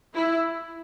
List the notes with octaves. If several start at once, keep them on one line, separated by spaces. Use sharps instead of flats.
E4